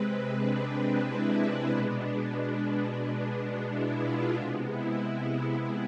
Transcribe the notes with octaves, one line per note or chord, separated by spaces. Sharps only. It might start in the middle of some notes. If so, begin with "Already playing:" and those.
Already playing: C3 G#3 C4 B4
D4
E4
D4
B2 G#3 B3 D4
E4
F4
C3 G#3 B3 D4
E4
E4